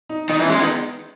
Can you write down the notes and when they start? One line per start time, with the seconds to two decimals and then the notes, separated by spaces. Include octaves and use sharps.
0.09 D#4
0.30 D#3 D#4
0.40 E3 C#4
0.50 G#3
0.57 D#3 B3